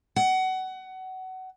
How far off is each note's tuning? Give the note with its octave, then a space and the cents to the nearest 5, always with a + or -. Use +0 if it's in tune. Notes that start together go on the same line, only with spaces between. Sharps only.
F#5 +25